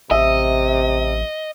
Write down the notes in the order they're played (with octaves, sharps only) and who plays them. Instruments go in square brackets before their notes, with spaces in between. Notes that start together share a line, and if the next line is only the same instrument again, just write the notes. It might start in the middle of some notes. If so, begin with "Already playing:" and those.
[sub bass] A1 [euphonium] C3 [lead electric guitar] D#5 [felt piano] E5